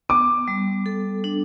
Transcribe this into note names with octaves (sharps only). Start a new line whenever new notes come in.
B3 D6
G3
A4
D4